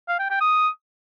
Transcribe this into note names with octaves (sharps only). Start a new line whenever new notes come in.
F5
G5
G5
D#6